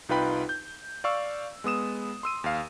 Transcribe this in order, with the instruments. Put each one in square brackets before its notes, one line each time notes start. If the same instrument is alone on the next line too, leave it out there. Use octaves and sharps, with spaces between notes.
[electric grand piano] C2 D#4 F4 B4 G5 B5
G6
D5 F5 C#6 E6
G#3 B3 D#6 E7
C6 E6 D#7
D#2 F5